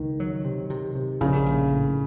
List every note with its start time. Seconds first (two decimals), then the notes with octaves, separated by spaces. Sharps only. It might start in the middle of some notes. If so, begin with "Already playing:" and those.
Already playing: C#2 D#3
0.20 F#3
0.45 C3
0.70 C3
0.95 C3
1.21 A#1 C#3
1.46 A#1
1.72 A2